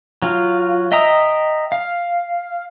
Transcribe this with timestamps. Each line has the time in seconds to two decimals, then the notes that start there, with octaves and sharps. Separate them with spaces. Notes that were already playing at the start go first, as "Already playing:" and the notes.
0.22 F#3 F4
0.92 D#5 E5 G5 A#5 D#6
1.72 F5